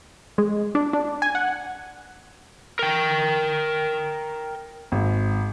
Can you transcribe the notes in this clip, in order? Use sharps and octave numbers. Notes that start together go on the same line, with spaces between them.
G#3
D4
D4
G#5
F#5
A#4 G5
G#1